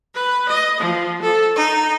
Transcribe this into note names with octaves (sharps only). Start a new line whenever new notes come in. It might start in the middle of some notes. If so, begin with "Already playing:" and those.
B4
D#5
F3
A4
D#4